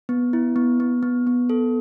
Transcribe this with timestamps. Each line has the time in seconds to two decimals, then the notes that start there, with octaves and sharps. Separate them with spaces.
0.09 B3
0.33 E4
0.56 B3
0.80 B3
1.03 B3
1.27 B3
1.50 A4